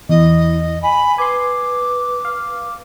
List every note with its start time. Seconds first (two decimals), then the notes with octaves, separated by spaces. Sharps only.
0.09 E2 E4 D#5
0.83 G#5 B5
1.18 B4 G#5 C6 D6
2.25 F5